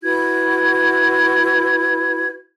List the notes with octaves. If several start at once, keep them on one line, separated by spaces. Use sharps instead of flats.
E4 F#4 B4 G#6